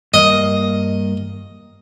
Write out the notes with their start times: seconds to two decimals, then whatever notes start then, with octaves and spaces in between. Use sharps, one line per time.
0.14 G2 A#3 D#5